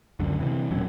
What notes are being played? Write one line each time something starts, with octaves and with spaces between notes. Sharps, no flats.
C#2 F#2 D3
C3 E3
E1 A#2 F#3 C#4